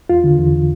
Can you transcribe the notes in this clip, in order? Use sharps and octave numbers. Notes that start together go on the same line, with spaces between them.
E2 F4
D3
E2